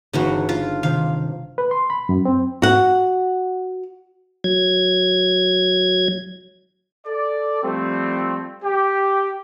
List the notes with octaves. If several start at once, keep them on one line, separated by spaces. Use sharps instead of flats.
G1 C#3 E3 F#3 D#4 F#6
F4
C3 D#3 F5
B4
C6
B5
F#2
C4
F#4 F#5
F#3 G#6
A4 D5
F3 G3 A3 C4
G4